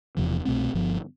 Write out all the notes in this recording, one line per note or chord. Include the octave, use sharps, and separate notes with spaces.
E1 E2 C3 F3
C2 B2 A3 C4
G1 G2 F3 B3